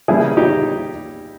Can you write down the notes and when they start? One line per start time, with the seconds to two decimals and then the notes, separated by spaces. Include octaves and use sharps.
0.08 C#3 E3 G3 A#3 E4 G#4
0.37 D#4 G4